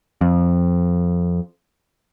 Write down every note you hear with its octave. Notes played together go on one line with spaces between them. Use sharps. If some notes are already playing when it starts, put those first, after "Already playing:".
F2